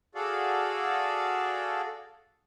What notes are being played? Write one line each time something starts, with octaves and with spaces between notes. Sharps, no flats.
F#4 G#4 A4 D5 F5